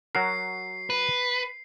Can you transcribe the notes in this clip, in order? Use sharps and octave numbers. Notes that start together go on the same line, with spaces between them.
F#3 F#4 A#4 C7
B4